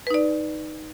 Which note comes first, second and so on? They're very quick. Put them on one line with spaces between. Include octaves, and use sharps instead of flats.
B4 D#4 D5